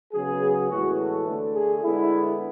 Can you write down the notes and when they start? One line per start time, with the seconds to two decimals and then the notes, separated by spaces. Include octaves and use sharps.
0.13 C#3 F#3 B3 G#4
0.70 A2 E3 G#3 B3 F#4
0.98 A4
1.27 D3 A3
1.55 G#4
1.83 D3 G#3 B3 E4